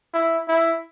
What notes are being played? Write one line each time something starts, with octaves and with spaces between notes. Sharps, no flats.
E4
E4